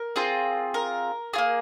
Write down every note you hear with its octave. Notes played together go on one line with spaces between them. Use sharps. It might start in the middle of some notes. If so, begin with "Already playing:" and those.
Already playing: A#4
C4 F4 G#4
A#4
A#3 F4 G#4